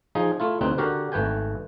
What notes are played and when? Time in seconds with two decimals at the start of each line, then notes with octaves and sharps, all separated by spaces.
0.15 F3 D#4 G#4 G#5
0.40 A3 E4 F4
0.61 D2 C4 D#4 B4
0.78 D3 F#4 G4 A#4
1.12 G#1 A3 B4 G5 G#5